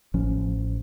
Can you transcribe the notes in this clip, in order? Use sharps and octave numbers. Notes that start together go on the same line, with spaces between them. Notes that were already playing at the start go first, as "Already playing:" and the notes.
A1 F3 C#4